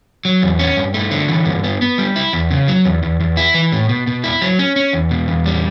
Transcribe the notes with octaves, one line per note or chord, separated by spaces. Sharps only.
F#3
E2
C#4
G2
A3
D3
E3
G2
B3
B3
G3
E4
E2
C#3
F#3
E2
E2
E2
E4
E3
A2
B2
B2
E4
F#3
C#4
C#4
E2
B2
E2
G3